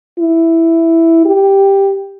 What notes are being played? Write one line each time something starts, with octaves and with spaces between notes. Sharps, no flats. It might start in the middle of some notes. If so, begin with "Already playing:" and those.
E4
G4